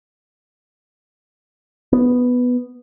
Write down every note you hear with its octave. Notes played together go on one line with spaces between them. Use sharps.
B3